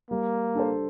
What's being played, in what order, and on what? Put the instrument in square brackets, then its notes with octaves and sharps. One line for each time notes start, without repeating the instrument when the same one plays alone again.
[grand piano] G3 [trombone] A#3
[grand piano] D4 A4 C5